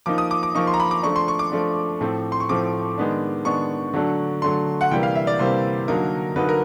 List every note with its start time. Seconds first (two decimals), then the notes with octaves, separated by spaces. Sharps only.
0.06 F3 A#3 D#4 D6
0.18 D#6
0.31 D6
0.43 D6
0.55 F3 A#3 D#4 C#6
0.67 C6
0.74 A#5
0.80 B5
0.91 D6
1.03 F3 A3 D4 C#6
1.16 C6
1.28 C#6
1.39 D6
1.52 F3 A3 D4
2.00 A2 F3 A3 C4
2.32 C6
2.40 C#6
2.49 A2 F3 A3 C4 D6
2.98 D#3 G#3 B3 D4
3.45 D#3 G#3 B3 D4 C#6
3.94 D3 F#3 A3 D4
4.42 D3 F#3 A3 D4 C6
4.81 F#5
4.91 C3 E3 G3 A#3 G5
5.03 F5
5.15 E5
5.27 D5
5.39 C3 E3 G3 A#3 C5
5.88 D3 F#3 A#3 D#4 A#4
6.36 D3 F#3 A#3 D#4 B4
6.49 A#4